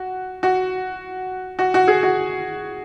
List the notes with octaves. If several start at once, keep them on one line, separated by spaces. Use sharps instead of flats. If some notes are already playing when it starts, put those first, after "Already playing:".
Already playing: F#4
F#4
F#4
F#4
G#4
F#4